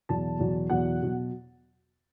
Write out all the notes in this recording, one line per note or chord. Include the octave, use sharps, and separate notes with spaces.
E2 B2 F#3 A5
E2 B2 F#3
E2 B2 F#3 F#5
B2 F#3